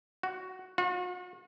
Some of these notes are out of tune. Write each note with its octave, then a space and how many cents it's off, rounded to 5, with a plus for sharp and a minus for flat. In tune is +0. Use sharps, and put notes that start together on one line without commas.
F#4 +5
F#4 -45